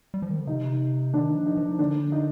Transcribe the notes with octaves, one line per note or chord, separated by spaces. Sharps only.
G3
F3
D#3
D3
C3 D#4
D#3 D4
F3
D#4
F3
D3 D4
D#4